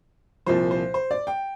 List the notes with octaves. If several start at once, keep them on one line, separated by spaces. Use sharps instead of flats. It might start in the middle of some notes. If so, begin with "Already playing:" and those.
C2 A#2 F3 C5
C5
C5
D5
G5